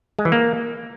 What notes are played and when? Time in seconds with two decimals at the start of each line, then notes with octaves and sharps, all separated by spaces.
0.19 G#3
0.25 E3
0.32 A#3